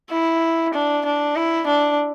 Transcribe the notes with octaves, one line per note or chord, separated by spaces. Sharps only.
E4
D4
D4
E4
D4